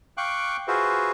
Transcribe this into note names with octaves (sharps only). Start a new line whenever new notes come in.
F5 G5 C#6 D6 F#6
F4 F#4 G#4 B4 C5 E5